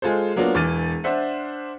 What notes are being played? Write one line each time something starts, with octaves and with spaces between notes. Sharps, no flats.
G#3 F4 G#4 A4 C5
F#3 A#3 B3 D4 F4
E1 E3 D6 F6 A6 D#7
D4 C5 E5 F#5